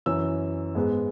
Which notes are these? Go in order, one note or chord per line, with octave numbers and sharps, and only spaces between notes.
F#2 E3 C#4 E6
G#2 G#3 B3